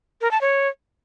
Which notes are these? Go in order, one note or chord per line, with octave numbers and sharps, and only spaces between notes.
A#4
A5
C#5